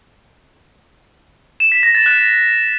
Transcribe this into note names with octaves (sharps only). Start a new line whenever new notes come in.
E7
B6
A#6
A6
F#6